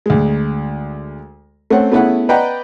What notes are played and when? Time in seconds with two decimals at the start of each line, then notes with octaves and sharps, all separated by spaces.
0.06 D2 G#3
1.70 A3 C4 C#4 C#5 F#5
1.92 A3 B3 C#4 E4 G#4 F#5
2.29 B4 D5 D#5 F#5 G5 A#5